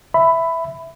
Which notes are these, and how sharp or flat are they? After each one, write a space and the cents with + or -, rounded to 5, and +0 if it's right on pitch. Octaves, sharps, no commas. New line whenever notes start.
E5 +0 B5 +15